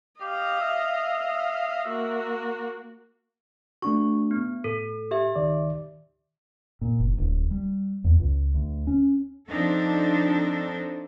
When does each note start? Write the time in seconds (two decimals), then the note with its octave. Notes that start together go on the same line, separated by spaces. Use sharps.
0.21 G4 D#5 F5
0.61 E5
1.88 A#3 F#4
3.82 A3 D4 F#4 C#6
4.31 B3
4.64 A2 A4
5.11 G4 E5
5.36 C#2 D#3 D5
6.81 A#2
6.99 F#1
7.18 D1
7.51 G3
8.04 E2
8.19 C#2
8.54 D2
8.87 C#4
9.49 F3 C4 D4 D#4 A4